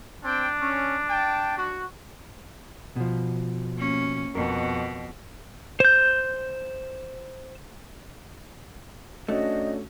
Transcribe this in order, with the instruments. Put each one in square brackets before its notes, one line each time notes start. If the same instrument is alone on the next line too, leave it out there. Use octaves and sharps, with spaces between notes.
[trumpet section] C4 G5 [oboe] D4
[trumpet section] C#4
G5 A5
F#4
[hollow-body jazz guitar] B2 F3
[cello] A#3 C#4
[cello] F2 B2 [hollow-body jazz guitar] A#4
[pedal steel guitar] C5 G6
[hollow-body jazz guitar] A3 [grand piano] C#4 D4 F#4 [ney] D#5